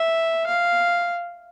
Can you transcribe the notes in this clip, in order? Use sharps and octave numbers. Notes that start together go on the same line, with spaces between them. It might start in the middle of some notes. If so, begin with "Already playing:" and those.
Already playing: E5
F5